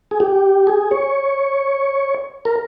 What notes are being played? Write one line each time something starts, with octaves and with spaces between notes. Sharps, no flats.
G#4
G4
G#4
C#5
A#4